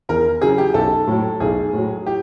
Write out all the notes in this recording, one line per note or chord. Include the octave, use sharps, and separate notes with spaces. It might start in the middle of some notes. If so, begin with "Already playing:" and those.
E2 A#4
C#3 F#3 G#4
G4
B1 A4
A2 F#3
B1 G#4
A2 F#3
G4